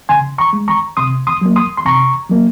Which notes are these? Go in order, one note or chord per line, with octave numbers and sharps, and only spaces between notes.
C#3 G#5 C6
A#5 C#6
G#3
A#5 C#6
C3 C6 D#6
C6 D#6
F#3 A#3
C6 D#6
C6
C3 A#5 C#6
F#3 A#3